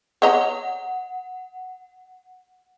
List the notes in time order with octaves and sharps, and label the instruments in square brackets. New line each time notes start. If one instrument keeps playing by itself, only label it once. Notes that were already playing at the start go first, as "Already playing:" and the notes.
[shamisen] C#5 D#5 A#5 [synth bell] F#5